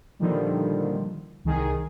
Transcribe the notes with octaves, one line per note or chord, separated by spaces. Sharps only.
A#2 D3 D#3 F3 G3
C2 D#3 G#4